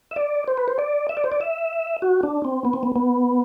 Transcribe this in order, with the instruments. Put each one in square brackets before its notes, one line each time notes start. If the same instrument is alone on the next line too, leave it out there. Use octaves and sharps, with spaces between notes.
[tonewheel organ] E5
D5
C5
B4
C5
D5
E5
D5
C5
D5
E5
F#4
D4
C4
B3
C4
B3
B3